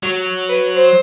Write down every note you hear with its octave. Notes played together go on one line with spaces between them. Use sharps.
F#3
B4
C5